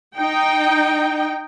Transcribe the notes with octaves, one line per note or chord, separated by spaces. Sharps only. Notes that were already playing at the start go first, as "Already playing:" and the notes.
D#4 G5